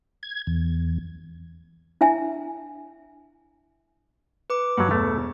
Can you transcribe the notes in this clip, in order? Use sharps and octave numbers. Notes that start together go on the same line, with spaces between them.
G#6
E2
D4 E4 E5 G#5
B4 D6
G2 F#3 F#5
E1 A3